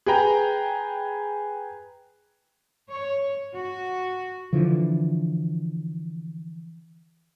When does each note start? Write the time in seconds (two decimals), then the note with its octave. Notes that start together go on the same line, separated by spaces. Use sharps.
0.06 G#4 B4 G5 A#5
2.91 C#5
3.56 F#4
4.53 D3 E3 F3